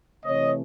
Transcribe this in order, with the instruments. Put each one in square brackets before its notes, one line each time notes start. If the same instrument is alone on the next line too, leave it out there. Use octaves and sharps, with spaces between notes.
[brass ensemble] C3 E3 A3 C#5 D#5